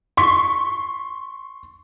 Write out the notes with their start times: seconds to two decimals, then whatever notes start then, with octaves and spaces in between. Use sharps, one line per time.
0.17 C6 C#6 B6